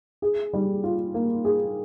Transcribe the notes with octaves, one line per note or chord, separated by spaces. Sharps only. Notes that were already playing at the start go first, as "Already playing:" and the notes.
G#4
G3
F4
A#3
G#4